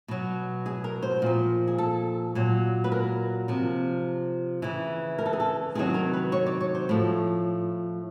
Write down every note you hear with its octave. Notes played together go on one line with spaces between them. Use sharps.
B2 F#3
G#4
A#4
C5
A#2 F3
G#4
A4
A#2 F#3
B4
A#4
C3 F3
C#3 E3
A#4
A4
G#4
A4
C3 D#3 F#3 G#4
A#4
B4
C#5
D5
C#5
C5
A2 F3